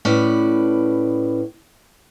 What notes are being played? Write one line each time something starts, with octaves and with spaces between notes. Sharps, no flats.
A2 C#4 B4 D5